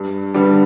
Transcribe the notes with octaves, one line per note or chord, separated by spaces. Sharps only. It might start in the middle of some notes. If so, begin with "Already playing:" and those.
Already playing: G2
D3 G3 B3